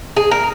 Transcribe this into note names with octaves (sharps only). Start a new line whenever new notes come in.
G#4
A#4